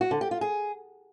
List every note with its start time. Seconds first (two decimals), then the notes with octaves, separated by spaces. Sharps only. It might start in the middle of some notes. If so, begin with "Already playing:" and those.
0.01 F#4
0.11 D3
0.21 G4
0.31 F4
0.41 G#4